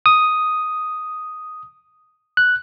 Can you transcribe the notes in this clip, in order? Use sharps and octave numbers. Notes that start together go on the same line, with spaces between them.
D#6
F#6